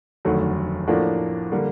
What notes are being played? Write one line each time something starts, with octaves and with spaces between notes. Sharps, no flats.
F1 D#2 D3 F#3 A3
A2 F3 A#3 D4 F#4
D3 G3 A#3